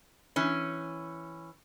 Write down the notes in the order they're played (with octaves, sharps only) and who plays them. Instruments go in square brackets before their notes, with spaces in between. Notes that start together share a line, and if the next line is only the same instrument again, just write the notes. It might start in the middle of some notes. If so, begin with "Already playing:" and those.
[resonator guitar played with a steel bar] E3 C#4